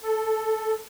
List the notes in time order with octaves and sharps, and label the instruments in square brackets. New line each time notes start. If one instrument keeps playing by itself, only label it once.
[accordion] A4